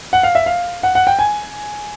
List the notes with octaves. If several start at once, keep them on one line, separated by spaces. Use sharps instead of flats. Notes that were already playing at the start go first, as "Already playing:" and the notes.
F#5
F5
E5
F5
F#5
F#5
G5
G#5